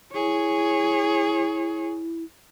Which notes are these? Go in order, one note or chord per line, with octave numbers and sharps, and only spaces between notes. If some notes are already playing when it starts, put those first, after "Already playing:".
E4 G#4 C#5